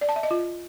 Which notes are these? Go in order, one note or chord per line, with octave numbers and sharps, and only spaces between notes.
D5
A5
E5
D#5
F4